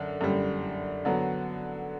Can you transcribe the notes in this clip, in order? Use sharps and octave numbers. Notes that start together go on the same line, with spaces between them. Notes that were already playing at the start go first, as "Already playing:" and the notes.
Already playing: F#2 D3
F#2 D3 G3
D3 F#3 B3